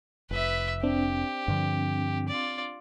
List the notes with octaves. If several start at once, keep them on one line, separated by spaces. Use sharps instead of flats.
F1 B4 E5
C4 D4 G4
G2 D3 F3
F4 D5